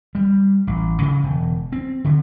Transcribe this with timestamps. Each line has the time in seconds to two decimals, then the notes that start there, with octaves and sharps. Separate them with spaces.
0.15 G3
0.67 A1
1.02 C#3
1.23 E1
1.72 C4
2.04 D3